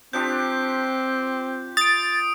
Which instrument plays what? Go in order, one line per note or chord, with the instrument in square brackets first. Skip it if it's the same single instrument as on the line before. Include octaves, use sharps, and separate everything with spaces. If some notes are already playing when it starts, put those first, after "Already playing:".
[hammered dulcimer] F3 D4 G4 [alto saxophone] C4 [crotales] G6
[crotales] D#6 D7 [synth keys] A6